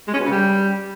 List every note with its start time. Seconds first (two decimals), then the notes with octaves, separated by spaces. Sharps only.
0.08 G#3
0.14 C#4
0.19 B2
0.25 C#3
0.31 G3